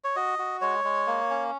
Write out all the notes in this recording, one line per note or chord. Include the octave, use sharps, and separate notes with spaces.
C#5
F#4 D#5
F#4
G#3 C#5
G#3
A#3
C#4